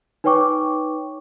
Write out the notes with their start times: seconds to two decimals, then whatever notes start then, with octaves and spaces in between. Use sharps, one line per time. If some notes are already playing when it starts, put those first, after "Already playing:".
0.24 D#4 B4 C#5 G5 C#6 D6